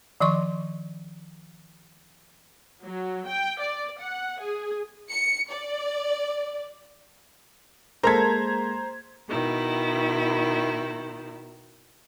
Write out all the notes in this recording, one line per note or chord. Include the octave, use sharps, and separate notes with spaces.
D#3 F3 D5 C6 C#6
F#3
G5
D5
F#5
G#4
C#7
D5
G#3 A#3 A4 A#4 C5 A#5 G#6 B6
B2 D#3 E4